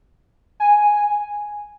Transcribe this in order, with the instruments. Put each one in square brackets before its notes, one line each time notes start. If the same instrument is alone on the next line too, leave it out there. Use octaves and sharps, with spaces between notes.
[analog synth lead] G#5